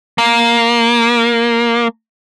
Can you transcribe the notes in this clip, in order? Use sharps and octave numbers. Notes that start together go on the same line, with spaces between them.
A#3